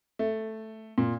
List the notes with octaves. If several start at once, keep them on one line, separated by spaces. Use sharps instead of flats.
A3
A#2